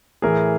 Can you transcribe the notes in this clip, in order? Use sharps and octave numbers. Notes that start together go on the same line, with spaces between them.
A2 E3 G#4 A#4